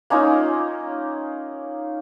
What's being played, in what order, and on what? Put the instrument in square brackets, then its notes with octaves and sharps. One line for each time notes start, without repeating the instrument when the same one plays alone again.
[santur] A#3 C#4 D#4 F4